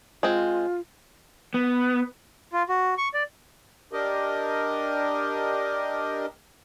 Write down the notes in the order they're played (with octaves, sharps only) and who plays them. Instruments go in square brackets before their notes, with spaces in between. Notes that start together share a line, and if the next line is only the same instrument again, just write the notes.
[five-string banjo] G#3 C4 [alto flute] F4
[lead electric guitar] B3
[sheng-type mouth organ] F4
F#4
C#6
D5
[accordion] D4 G4 A#4 D#5